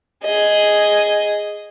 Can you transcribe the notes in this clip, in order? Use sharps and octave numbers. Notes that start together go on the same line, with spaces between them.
G#4 D#5